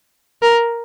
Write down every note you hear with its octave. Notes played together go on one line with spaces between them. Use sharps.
A#4